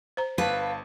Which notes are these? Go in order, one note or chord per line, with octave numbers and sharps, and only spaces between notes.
C5 A#5
G1 B4 F5 A5